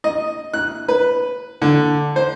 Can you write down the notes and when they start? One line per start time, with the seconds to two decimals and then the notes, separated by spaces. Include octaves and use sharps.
0.04 D#5
0.54 F#6
0.88 B4
1.62 D3
2.16 C5